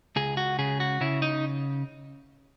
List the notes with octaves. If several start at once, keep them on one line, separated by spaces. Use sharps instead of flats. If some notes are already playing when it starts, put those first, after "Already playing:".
C#2 G#4
F#4
C#3 G#4
F#4
C#3 E4
D#4